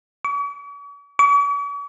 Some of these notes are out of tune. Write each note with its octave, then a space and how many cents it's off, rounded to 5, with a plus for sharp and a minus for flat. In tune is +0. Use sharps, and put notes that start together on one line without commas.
C#6 +45
C#6 +45